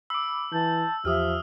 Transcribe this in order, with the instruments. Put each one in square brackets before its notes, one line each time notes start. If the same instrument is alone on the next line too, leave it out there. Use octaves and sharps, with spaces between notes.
[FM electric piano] B5 D6 [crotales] E6
[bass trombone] E3 [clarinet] A5 [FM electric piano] G6
[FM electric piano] E2 G4 [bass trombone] F3 [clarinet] E5 [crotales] D#6 F6